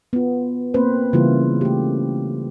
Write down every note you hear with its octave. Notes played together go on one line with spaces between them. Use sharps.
B3 F4
A#3 C4 B4 C5
C#3 E3 G3 A#3 E4 F4
A3 G4